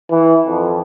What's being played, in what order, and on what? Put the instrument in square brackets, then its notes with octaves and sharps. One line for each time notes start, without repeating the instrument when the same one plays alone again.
[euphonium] E3
F2